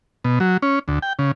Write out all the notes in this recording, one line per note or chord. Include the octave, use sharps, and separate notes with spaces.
B2
F#3
C#4
D2
G5
C#3